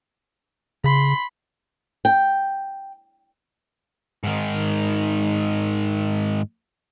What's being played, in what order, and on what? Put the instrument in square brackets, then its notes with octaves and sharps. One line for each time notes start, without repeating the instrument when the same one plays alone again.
[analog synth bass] C#3 [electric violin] B5 C6
[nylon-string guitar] G5
[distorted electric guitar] G#2 D#3